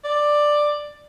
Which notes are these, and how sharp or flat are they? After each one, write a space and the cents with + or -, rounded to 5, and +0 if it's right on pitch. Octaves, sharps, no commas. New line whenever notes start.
D5 +10